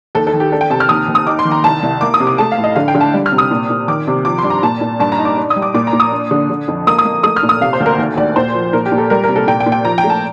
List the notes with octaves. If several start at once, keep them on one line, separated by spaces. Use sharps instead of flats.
D#2 A4
A4
D#3
G4
D4 A4
G5
C3 A5
F6
D#2 D#6
D#2
D#6
D#4 D6
C6
D#3
A#5
C2 A5
C2
A#3 D6
D#6
C3
D6
A3 A5
F5
A2
D#5
D3 F5
G5
D3
A5
G3
F6
C3
D#6
A#2
A#2
D#3 D6
C3
F3 D6
C6
G2
A#5
A#2 A5
A#2
G2 A5
A#5
D#4
D6
D4
D#6
G3
D6
A#2 D6
A#5
A#2
D#6
D4
D3
D3
F2
A#3 D#6
D#6
A#3
A3 D#6
F6
A#2
D#6
C3 F5
C5
D2
A#4
D#2
D#2 D5
A#2 C5
F3
A#2 A#4
G4
A#2
A4
G3 A#4
A#4
C3
A4
A#2 G5
G5
A#2
G5
F3 A#5
G5
A3
A5